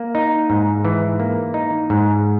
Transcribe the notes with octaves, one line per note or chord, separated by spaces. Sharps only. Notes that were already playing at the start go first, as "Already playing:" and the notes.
Already playing: A#3
D#4
G#2
E3
A#3
D#4
G#2